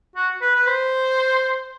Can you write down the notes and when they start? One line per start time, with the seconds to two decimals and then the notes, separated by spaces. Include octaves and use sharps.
0.15 F#4
0.41 B4
0.55 B4
0.67 C5